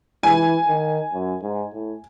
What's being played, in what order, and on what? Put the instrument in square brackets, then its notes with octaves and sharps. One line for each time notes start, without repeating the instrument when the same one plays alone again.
[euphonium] E3 [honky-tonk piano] G#5
[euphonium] D#3
F#2
G#2
A2